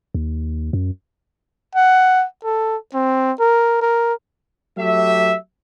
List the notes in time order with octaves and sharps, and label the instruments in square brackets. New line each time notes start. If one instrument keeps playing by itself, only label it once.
[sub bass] D#2
F#2
[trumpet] F#5
A4
C4
A#4
A#4
[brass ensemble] F#3 A3 G4 E5